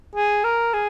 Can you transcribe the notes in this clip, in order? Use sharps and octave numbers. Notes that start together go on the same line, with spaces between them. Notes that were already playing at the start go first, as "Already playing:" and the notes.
G#4
A#4
G#4